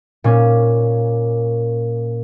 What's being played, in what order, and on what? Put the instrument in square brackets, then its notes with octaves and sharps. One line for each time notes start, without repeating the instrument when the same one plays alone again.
[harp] A#2 C#4